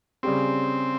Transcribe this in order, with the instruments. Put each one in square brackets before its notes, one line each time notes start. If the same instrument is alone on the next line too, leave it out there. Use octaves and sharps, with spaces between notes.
[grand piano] C#3 G3 C#4 G4 [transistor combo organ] C4